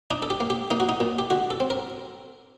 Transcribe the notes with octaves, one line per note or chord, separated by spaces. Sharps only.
D4 D#4
A4
G4
A#3
G4
A#3 D#4
F#4
D#4
A#2
G4
D3 F#4
A4
C4
A#4